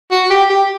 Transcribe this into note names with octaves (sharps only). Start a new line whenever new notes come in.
F#4
G4
G4